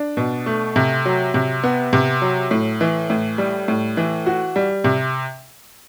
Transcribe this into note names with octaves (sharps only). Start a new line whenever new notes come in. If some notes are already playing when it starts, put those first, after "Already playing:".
Already playing: D4
B2
A3
C3
F#3
C3
B3
C3
F#3
A2
E3
A2
G3
A2
E3
F#4
G3
C3